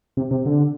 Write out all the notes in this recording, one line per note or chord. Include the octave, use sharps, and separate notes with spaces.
C3
C3
D3